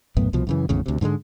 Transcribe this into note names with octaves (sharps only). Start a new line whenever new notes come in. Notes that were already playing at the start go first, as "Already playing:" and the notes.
B1 F#2 A2 B3
C2 B2 F3
F#2 C#3 E3
G#1 E2 A2 C#3
D2 C3
G#2 D3 E3 G#3